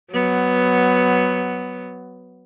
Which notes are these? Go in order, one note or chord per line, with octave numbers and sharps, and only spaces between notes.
F#3 B3